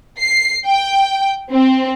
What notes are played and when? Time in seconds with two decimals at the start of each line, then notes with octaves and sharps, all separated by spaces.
0.19 C7
0.66 G5
1.51 C4